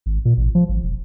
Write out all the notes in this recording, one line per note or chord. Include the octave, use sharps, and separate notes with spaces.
G#1
A#2
A1
F3
G#1
E1